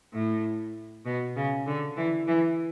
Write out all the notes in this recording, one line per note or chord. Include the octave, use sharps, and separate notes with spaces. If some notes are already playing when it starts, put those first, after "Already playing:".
A2
B2
C#3
D3
E3
E3